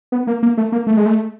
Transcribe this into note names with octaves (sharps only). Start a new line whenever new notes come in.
B3
A#3
A#3
A3
A#3
A3
G#3
A3